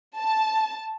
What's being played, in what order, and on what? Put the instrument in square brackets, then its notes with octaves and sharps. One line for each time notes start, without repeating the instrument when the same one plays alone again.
[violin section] A5